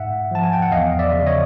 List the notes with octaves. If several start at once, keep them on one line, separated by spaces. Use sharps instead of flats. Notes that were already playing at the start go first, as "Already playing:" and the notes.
Already playing: G#2 E5 F#5
F3 A5
G#5
G5
F#5
E2 D#5 F5
D5 E5
C#3
C#5 D#5